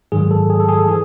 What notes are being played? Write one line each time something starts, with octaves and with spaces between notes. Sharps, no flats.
G#2 D#3 F#3 G#4
A4
G#4
A4
G#4
A4
E3 G#4